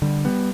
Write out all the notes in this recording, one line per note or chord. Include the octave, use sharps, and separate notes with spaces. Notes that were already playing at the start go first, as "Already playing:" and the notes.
D3 G3
G3 B3